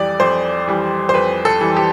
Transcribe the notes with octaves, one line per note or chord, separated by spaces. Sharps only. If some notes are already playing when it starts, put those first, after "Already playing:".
Already playing: F2 E3 G3 D5
F2 C5
E3 G3
C5
F2 B4
A4
E3 G3
G4